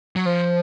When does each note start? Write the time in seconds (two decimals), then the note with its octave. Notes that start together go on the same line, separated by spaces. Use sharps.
0.16 F#3
0.25 F3 C5